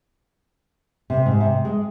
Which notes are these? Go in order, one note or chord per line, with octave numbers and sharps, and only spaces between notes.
C3
G#2
C3
G#3